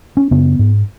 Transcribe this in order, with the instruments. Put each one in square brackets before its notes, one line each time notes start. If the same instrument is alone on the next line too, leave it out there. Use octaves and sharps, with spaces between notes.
[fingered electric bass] C#4
F#2 C#3 B3
G#2